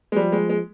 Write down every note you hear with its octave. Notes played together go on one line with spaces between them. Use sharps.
G#3
F3 G3
G#3
G#3